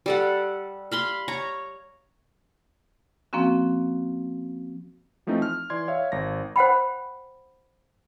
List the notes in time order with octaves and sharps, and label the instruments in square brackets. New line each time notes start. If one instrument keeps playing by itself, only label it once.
[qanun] G3 A4 F#5
F5 B5 C6
C#5 A#5
[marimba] F3 A#3 C4 C#4 F#4
[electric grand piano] E3 F3 A3 C4 D#4
F6
E3 D5 C6 G#6
C#5 E5 F5
G#1 A#6
[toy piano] C5 F#5 G5 B5